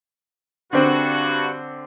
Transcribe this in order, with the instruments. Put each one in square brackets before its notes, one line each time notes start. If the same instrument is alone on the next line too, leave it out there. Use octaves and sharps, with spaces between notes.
[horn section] G2 F#4 [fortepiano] D3 C4